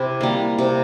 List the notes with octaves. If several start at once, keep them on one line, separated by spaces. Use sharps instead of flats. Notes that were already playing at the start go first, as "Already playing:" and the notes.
Already playing: C3 E4
G3 A#3
C3